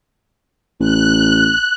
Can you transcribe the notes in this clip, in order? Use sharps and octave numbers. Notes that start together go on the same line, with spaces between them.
A1 F#6